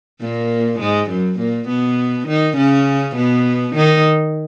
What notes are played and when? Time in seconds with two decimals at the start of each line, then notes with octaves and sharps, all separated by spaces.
0.21 A#2 A#3
0.80 G#2 G#3
1.10 F#2 F#3
1.39 A#2 A#3
1.68 B2 B3
2.28 D#3 D#4
2.57 C#3 C#4
3.16 B2 B3
3.75 D#3 D#4